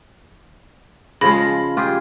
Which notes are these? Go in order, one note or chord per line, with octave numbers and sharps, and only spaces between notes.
C#3 F3 G#3 B5 A#6
F4 G4 G#4